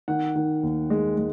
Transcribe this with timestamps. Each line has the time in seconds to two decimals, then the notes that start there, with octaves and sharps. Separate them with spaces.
0.08 D#3 F#5
0.36 D#3
0.63 D#2
0.90 G#3
1.18 G#3